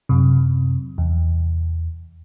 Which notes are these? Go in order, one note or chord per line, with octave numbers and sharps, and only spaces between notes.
F#2 C3
E2